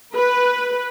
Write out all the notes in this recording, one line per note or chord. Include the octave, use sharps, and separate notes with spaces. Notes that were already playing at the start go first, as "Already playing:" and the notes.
B4